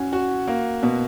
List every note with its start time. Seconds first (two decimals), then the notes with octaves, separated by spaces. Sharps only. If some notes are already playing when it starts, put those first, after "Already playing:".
Already playing: C#4 F#4
0.13 F#4
0.48 A#3
0.83 B2